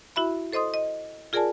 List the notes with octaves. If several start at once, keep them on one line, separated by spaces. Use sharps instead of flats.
E4 F#4 E5 B5
A4 C5 D#5 C6 D#6
D#5
F4 G#4 A#4 D5 G#5 A5